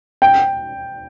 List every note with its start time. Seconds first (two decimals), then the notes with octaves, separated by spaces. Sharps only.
0.22 G5